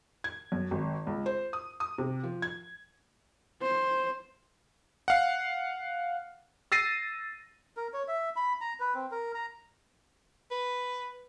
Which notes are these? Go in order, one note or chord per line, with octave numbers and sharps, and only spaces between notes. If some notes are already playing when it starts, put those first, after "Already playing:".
G#6
F#2
G#1
C#2
C5
D#6
D#6
C3
F3
G#6
C5
F5 F#5
E6 A6 A#6 C7 D#7
A#4
C#5
E5
B5
A#5
B4
C4
A#4
A#5
B4